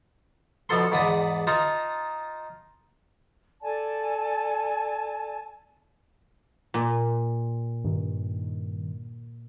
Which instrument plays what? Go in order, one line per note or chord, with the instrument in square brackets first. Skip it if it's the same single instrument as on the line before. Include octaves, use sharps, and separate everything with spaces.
[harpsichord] D2 B2 F3 A4 C6
E2 G#2 D5 B5 D#6
D#4 F4 A5 A#5
[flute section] A4 D5 G#5 A5
[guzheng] A#2
[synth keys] G2 D#3